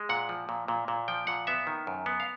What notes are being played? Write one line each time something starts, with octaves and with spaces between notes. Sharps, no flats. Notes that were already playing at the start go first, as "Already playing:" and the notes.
Already playing: G#3
A#2 F#5
F3
A#2
A#2
A#2
F3 G5
A#2 F#5
B3 E5
D#3
F#2
B3
F5